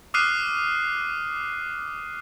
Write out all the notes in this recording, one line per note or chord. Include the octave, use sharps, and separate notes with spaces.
D6 D#6 F6 F#6 C7 D#7